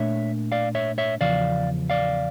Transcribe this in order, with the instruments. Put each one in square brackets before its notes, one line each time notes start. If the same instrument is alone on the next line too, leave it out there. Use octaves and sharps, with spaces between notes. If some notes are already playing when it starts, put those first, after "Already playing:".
Already playing: [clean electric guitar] A#2 A3 D4 C#5 E5
D5 F5
C#5 E5
C#5 E5
E2 C#3 F3 D5 F5
D5 F5